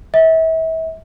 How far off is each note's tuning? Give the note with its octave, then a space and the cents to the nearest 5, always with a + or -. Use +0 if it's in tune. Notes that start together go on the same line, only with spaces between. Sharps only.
E5 -35